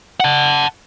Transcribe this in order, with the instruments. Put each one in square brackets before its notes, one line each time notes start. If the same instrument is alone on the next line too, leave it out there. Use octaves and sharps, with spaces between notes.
[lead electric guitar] F#5 A5